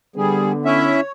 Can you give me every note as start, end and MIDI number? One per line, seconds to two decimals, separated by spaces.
0.16 0.97 50
0.16 0.52 55
0.16 0.97 59
0.16 0.52 68
0.65 1.01 61
0.65 1.01 64
0.65 1.12 73
0.65 1.01 76